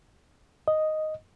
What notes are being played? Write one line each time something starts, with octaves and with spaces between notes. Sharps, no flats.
D#5